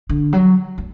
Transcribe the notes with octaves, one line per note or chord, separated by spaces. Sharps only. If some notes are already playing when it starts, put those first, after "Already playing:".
D3
F#3
A3